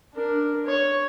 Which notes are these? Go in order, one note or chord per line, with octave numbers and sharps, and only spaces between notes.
D4 A#4
C#5